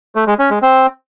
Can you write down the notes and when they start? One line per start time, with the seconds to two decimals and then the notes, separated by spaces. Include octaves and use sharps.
0.15 A3
0.27 G#3
0.39 C#4
0.50 G#3
0.62 C4